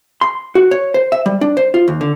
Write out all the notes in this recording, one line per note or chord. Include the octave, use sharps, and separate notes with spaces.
C6
F#4
C#5
C5
E5
G3
D4
C5
F4
D#2
D3